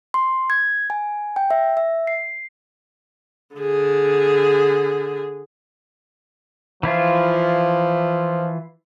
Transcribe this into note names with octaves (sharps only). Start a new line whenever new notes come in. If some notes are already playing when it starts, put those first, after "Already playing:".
C6
G#6
G#5
G5
E5
E5
C7
D3 G#4
E3 F3 E4 F4